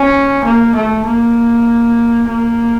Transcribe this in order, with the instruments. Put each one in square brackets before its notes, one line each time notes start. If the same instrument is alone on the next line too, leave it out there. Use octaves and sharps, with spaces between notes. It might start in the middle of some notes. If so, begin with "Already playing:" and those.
Already playing: [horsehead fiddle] C#4
A#3
A3
A#3
A#3